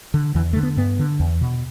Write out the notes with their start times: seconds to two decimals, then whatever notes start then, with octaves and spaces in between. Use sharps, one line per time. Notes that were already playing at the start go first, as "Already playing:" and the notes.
0.14 D3
0.35 E2 E3
0.53 D3 A3
0.63 B3
0.77 G2 B3
0.99 D3
1.20 E2
1.41 B2